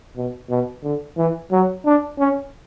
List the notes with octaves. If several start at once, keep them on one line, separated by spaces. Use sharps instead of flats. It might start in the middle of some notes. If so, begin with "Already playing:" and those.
B2
B2
D3
E3
F#3
D4
C#4